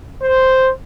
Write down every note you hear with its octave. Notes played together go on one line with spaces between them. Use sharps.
C5